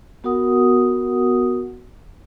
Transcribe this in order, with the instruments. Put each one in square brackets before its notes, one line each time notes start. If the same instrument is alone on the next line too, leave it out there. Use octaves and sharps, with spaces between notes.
[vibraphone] B3 F#4 A#4 F#5 D#6